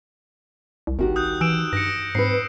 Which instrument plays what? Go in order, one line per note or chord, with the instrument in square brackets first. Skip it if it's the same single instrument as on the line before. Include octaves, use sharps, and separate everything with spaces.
[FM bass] C2
[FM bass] G#1 [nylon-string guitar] D#3 F#4 G4
[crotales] D#6 F#6 G6
[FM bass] E3 [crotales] E6 D7 E7
[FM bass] G2 [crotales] A#6 C#7
[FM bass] G#2 [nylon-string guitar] C4 B4 [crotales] C7